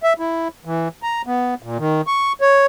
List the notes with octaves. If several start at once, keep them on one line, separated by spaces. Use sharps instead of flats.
E5
E4
E3
A#5
B3
A#2
D#3
C#6
C#5